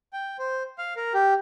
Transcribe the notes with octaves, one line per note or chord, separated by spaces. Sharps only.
G5
C5
F5
A#4
G4